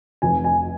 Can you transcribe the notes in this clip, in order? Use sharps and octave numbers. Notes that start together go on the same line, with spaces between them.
F1 G#5
G#5